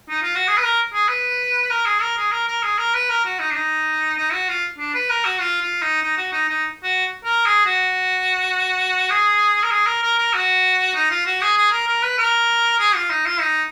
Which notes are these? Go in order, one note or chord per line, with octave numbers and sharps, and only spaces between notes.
D#4
F4
F#4
G#4
B4
A#4
G#4
B4
A#4
G#4
A#4
G#4
A#4
A#4
G#4
A#4
B4
A#4
F#4
D#4
D4
D#4
D#4
F#4
F4
D4
B4
A#4
F#4
F4
F4
D#4
D#4
F#4
D#4
D#4
F#4
A#4
G#4
F#4
G#4
A#4
G#4
A#4
A#4
A#4
F#4
D#4
F4
F#4
G#4
G#4
A#4
A#4
B4
A#4
G#4
F4
D#4
F4
D#4